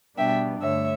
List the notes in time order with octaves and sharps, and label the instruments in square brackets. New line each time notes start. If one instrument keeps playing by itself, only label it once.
[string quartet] B2 G3 B3 D4 E5 G5
G2 D3 A3 C#5 E5